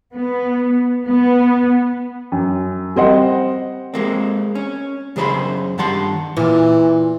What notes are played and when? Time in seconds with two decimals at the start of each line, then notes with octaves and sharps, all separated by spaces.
0.14 B3
1.07 B3
2.32 F#2
2.96 G3 C4 C5 D#5 F#5
3.94 G#3 A#3 C4
4.55 C#4
5.16 F#2 C#3 G#4 C5 B5 C6
5.78 G2 D#3 F#5 A5 C6
6.37 E2 A#2 E3